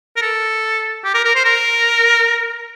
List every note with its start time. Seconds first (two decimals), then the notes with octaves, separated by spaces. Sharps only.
0.16 A#4
0.22 A4
1.04 G4
1.14 A#4
1.25 A#4
1.35 C5
1.45 A#4